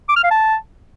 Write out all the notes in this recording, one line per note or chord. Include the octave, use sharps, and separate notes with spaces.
D6
F6
F5
A5